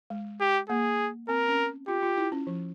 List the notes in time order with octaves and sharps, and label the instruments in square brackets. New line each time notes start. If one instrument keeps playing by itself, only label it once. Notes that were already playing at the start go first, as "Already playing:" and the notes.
[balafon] G#3
[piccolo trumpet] G4
[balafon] A#3 [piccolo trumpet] G#4
[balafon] C4 [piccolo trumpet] A#4
[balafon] C#4
[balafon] F4 [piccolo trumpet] G4
[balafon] F4
E4
C#4
F3